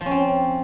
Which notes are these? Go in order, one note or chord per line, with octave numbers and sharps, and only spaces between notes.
F3
C#4
C4